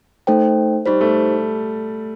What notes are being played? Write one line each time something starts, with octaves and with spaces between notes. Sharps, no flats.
A3 D#4 A4 C5 G5
G3 D#4 G4 C5
A3